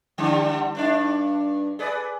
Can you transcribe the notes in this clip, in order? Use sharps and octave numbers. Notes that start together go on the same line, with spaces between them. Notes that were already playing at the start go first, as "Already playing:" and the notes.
D3 G3 D4
G2 D4 D#4
G#4 B4 D5